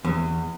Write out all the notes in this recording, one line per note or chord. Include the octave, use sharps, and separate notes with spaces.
E2